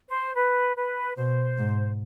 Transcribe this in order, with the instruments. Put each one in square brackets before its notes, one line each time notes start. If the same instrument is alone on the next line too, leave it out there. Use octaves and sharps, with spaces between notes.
[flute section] C5
B4
B4
[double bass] B2 [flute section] C5
[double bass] G#2